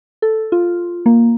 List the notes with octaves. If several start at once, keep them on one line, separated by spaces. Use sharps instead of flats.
A4
F4
A#3